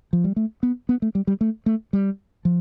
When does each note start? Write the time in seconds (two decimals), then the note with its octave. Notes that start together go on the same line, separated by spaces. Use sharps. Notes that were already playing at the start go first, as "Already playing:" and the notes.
0.13 F3
0.24 G3
0.36 A3
0.63 B3
0.89 B3
1.02 A3
1.15 G3
1.27 G3
1.41 A3
1.66 A3
1.93 G3
2.45 F3